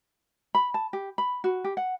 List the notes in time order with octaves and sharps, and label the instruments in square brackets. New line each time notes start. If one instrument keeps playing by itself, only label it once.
[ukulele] B5
A5
G4
B5
F#4
G4
F#5